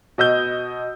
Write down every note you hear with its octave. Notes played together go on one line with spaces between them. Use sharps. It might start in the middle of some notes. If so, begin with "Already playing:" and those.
B2 D#5 E6 G6